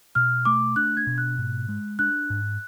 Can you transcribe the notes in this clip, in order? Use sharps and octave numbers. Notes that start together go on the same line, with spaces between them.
B2 F6
A3 D6
D4 F#6
G#6
B2
F#6
G#2
G#3
D4 F#6
G#2